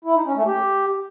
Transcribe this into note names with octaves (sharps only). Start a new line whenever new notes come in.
E4
D#4
C#4
A3
G4